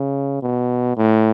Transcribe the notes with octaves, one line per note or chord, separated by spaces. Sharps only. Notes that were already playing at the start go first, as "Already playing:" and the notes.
Already playing: C#3
B2
A2